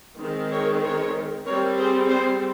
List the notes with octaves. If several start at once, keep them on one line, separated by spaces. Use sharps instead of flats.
D#3 G#3 C4
A#4 C#5
A#4 C#5
G3 C4 A#4 C#5
G#4 C5
G#4 C5